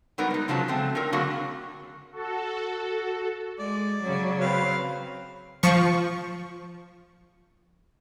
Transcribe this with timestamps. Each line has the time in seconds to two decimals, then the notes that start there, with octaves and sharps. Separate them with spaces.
0.18 F#3 G3 B3 D#4 A#4
0.30 G#3 D#4
0.48 F2 C#3 F3 F#3 A5
0.68 F#3 G#3 A3 C4
0.95 C4 D4 A#4
1.13 D3 F#3 G#3 A#3 F#4
2.12 F#4 A4
3.59 G#3 D5
4.03 C#3 F#3
4.40 C4 B4 F5
5.63 F3 C#6